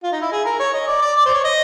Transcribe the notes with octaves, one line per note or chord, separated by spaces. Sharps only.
F4
D#4
E4
G#4
A#4
C#5
D#5
D5
D5
D5
C5
C#5
D#5